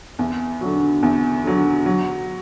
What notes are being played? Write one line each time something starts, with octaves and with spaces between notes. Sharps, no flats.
E2
D3 F#3
E2
D3 F#3
F#3